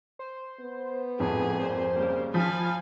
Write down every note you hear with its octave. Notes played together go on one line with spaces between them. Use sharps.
C5
B3
G#1 F2 A2 G#4
A#2 C5
C#3 G3 A#3
F3 F5 G#5 B5